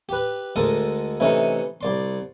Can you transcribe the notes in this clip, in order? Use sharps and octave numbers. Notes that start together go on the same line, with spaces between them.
G4 B4
D2 G#3 A4 A#4 D#5
C3 E3 A3 C#4 D#4
C2 D5 C6